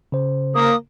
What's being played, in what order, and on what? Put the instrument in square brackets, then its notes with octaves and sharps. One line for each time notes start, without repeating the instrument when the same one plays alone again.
[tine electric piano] C#3 C5
[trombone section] A#3 [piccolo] D#6